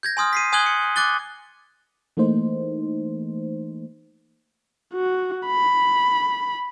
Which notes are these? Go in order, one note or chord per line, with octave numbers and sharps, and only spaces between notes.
G6 G#6 A#6
G#5 C6 D#6 F6
B6 C7 D#7
G#5 D#6 F#6 G#6 F#7 G7
C#7
D6 F#6 A6 G7
E3 A3 A#3 D#4 C5
F#4
B5